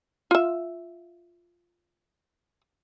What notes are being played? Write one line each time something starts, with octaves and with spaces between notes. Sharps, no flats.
F4 E5